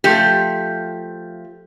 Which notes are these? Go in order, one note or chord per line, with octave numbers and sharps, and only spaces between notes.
F3 A3 G4